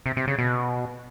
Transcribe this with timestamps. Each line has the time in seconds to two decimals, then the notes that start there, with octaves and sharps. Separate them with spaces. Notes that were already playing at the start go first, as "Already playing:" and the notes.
0.06 C3
0.17 C3
0.28 C#3
0.38 B2